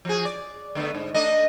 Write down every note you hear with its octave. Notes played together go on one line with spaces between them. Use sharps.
F3 F#4 G#4
D5
D3 A3 B3
G#2
A3 D4 D#5